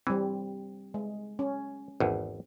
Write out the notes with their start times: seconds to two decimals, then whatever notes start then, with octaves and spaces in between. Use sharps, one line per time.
0.07 E3 G3 C4
0.94 G#3
1.39 C#4
2.00 G#1 E2